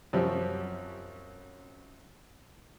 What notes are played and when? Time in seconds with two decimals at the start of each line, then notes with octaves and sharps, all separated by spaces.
0.13 F#2 C3 F3 G3 C4 C#4